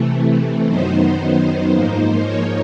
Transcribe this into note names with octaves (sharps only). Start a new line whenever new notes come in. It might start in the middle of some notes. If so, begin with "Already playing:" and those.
Already playing: C3 E3 A3
F#2 D#3 F#3 B3 D#4 C5
G#2 F3 A#3 D#4
C#5